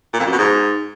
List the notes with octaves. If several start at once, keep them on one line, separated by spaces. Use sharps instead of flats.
A#2
F2
F#2
B2
G#2